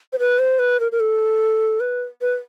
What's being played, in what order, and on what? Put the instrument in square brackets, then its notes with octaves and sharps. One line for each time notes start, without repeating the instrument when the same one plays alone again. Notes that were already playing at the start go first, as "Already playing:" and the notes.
[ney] C5
B4
C5
B4
A#4
A#4
A4
B4
B4